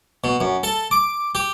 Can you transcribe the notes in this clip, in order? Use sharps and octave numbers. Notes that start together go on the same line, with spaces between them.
B2
F#2
A4
D6
G4